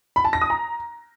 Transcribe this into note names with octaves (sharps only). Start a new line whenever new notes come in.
B5
A5
A#6
D#6
A#5